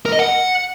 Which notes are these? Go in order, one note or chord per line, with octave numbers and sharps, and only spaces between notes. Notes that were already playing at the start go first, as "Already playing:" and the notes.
A#4
D#5
F#5